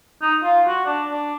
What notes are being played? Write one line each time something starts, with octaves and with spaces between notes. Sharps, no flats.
D#4
F4
F#4
D4
D4